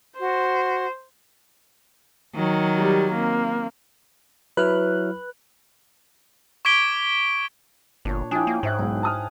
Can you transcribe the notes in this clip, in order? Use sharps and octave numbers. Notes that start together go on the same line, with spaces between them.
F#4 C5
D#3 F#3
G3
A#3 C4
F#3 E4 B4 F6 F#6
C#6 D6 G#6 B6 D7 G7
G1 A#2 D4 C#5
F3 D4 E4 G#4 G5
A#3
G#2 C5 E5 F#6
B1 B2 G#3 E4
A5 D#6 F6